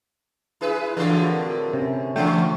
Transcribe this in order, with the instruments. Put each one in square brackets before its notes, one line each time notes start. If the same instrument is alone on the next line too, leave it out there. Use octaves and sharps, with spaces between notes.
[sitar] E4 G#4 B4
[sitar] A2 D3 E3 [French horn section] F4 F#4
[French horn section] F#3 C4 A#4
[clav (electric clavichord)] C3 [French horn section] C#4
[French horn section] D3 [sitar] E3 F3 C#4 [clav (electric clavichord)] A3 G5